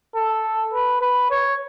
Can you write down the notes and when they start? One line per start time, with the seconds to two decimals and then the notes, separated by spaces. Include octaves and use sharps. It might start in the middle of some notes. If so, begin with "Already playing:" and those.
0.15 A4
0.74 B4
1.01 B4
1.30 C#5